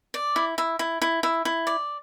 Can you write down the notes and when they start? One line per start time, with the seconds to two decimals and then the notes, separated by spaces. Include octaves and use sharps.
0.14 D5
0.36 E4
0.58 E4
0.79 E4
1.02 E4
1.23 E4
1.45 E4
1.67 D5